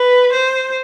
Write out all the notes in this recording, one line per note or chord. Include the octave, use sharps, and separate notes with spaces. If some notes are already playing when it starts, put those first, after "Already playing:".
Already playing: B4
C5